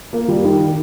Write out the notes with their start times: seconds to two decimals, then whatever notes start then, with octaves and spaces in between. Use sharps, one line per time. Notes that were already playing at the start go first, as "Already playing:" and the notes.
0.13 A#3
0.28 G3
0.44 D#3